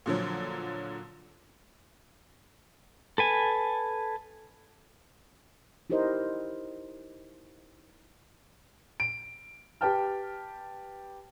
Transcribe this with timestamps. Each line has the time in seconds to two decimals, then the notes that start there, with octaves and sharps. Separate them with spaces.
0.06 A#2 D3 F3 F#3
3.18 A4 B4 G#5
5.90 D#4 E4 G4 A#4 C5 D#5
9.00 D7
9.81 G4 B4 G5 A5 F6